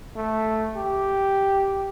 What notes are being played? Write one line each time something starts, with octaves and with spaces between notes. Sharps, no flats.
A3
G4